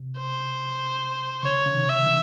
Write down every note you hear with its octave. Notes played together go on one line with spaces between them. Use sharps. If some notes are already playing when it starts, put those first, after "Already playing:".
Already playing: C3
C5
C#3 C#5
C#3
C3 D#3
E5
C#3 E3